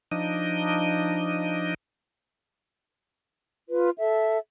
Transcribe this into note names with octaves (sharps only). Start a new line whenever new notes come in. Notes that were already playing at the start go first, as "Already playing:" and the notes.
F3 D4 D#4 D#5
F4 B4
A4 E5